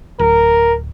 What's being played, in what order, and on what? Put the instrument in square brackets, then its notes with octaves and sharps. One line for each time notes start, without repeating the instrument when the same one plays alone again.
[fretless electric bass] D1 [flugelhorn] A#4